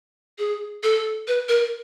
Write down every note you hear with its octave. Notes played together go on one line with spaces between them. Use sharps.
G#4
A4
B4
A#4